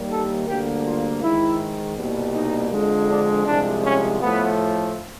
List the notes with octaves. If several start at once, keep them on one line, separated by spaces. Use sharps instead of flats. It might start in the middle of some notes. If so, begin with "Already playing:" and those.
Already playing: D#2 D#3 G3 A#3
A4
D2 D3 G3 A#3 G4
F4
G#2 D#3 G#3 E4
C2 B2 G3 A#3
D#4
F2 D3 F3 G#3
D4
C2 C3 F3 G#3 D4
C#4
A2 F3 A3 B3